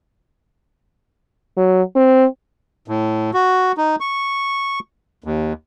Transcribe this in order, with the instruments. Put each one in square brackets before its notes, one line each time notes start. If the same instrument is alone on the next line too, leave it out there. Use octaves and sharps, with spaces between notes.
[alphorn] F#3
C4
[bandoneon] A2
F#4
D#4
C#6
D#2